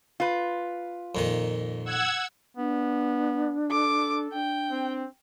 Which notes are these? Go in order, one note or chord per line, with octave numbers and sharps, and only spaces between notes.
F4 B4
F2 A#2 D#3
F#5 E6 G#6
B3 D4
A4 D6
D4 G5
C4